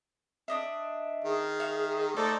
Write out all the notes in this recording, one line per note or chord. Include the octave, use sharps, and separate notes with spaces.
D4 D#5 E5
D#3 G#4
E5 F5
A3 D#4 A4 C5 D5